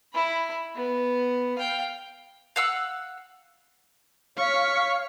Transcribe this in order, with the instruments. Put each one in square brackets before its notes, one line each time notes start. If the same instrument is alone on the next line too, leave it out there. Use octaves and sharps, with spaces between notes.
[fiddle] E4 B5
B3
F5 G5
[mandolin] F5 F#5 E6
[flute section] C#5 F5 F6 [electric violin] C#6 B6